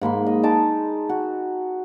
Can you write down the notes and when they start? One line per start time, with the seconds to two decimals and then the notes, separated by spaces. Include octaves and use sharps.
0.01 G#2 A#3 B5 C6
0.26 D#5
0.43 G#3 D#4 A5 D6
1.09 F#4